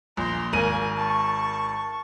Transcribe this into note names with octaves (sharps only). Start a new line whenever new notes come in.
A#1 A#5 C6
G#1 A#3 A#4 G#5 D#7
A5 C#6